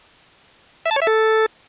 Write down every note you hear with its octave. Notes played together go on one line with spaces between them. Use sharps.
E5
A5
C#5
E5
A4